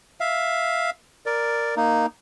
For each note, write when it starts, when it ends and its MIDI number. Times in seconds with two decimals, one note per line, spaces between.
0.20 0.90 76
0.20 0.90 77
1.26 1.75 70
1.26 1.75 74
1.76 2.06 58
1.76 2.06 63